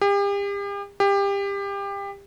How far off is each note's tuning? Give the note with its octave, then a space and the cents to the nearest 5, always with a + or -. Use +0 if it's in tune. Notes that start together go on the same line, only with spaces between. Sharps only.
G4 +40
G4 +25